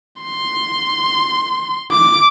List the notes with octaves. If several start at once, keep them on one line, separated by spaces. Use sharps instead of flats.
C6
D6